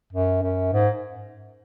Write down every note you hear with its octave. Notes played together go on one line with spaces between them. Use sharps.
F#2
F#2
G#2